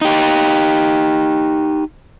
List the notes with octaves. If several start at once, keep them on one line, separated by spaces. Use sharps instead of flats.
D#4 G4